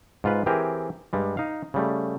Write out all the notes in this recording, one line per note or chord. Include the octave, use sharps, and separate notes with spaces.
G#2 F4 B4
E3 C4 G4 G#4 A#4
G2 G3 G#3
D#4 F5
C#3 G3 A3